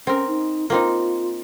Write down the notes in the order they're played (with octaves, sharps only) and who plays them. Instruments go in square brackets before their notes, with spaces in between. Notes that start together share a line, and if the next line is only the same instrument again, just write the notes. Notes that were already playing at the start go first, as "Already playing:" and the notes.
[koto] C4 A#4 [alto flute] C#4
[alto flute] D#4
[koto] A#3 C4 D#4 [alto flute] F4